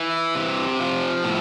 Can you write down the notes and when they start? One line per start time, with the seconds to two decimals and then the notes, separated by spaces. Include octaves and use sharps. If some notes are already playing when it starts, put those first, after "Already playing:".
Already playing: E3
0.35 C3
0.79 F3
1.24 A2